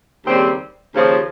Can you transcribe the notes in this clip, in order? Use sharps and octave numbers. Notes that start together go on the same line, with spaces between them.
D#2 C#3 G3 C4
D#2 C#3 F3